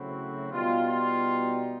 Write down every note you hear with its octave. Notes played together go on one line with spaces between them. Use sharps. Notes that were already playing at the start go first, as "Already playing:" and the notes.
Already playing: C#3 F#3 A3 C4 E4 F#4
B2 G3 B3 D#4 F4
F4